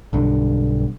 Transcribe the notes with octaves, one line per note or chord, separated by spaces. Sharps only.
B1 G2 D3